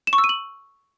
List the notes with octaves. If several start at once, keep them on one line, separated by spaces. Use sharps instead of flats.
E7
C#6
E6
D#7
F#7